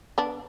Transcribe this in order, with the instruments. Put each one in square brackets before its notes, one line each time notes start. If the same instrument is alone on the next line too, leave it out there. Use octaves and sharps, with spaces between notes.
[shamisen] B3 D4